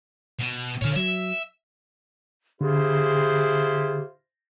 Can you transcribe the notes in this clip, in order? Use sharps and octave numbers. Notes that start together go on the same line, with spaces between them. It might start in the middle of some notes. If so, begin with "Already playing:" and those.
B2
A#2 D3 C#5 F5
F#3 E5
D3 E4 F4 G4 G#4 C5